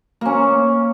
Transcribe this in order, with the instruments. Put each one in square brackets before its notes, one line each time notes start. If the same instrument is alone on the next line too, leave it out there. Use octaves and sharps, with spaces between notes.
[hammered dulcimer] A#3 C#4